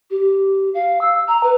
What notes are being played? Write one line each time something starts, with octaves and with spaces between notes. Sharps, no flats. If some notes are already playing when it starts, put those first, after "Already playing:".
G4
F5
E6
A#5
B4